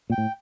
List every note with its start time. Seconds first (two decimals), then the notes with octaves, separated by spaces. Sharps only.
0.10 A#2 G5
0.18 A2